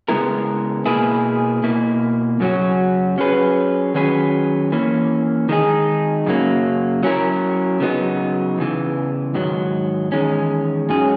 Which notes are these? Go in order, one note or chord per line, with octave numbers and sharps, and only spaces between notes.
C#3 G#3 B3 E4 A#4
B2 A#3 E4 G#4 B4
B2 A#3 E4
F#2 C#3 F#3 C#4 F#4
F#3 C#4 G#4 B4
D#3 F#3 C#4 G#4 B4
E3 A#3 C#4
D#3 G#3 D#4 G#4
F#2 C#3 F#3 A#3
F#3 C#4 E4 A#4
C#3 F#3 B3 D#4
E2 C#3 E3
G#2 D#3 F#3
E2 D#3 G#3 C#4
G#2 F#3 C#4 G#4